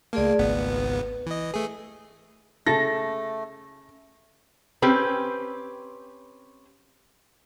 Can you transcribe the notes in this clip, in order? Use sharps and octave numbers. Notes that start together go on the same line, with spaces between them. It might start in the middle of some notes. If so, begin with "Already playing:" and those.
C#2 A3 A#3 G#4 D5
G#1 C#2 B3 B4
E3 D#5
A3 G#4
C#3 A3 A4 A5 A#6
C4 C#4 G4 B4